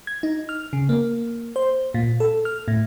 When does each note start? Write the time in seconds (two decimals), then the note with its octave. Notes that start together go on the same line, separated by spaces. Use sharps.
0.07 G#6
0.23 D#4
0.49 F6
0.73 C#3
0.89 A#3
1.56 C5
1.94 A#2
2.20 A4
2.45 F6
2.68 A2